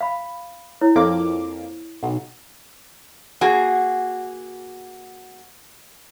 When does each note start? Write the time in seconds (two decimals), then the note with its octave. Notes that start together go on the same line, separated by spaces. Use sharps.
0.01 F5 B5
0.81 E4 C#5
0.96 F2 A#3 D6
2.03 B1 F#5
3.41 A#3 F#4 G#4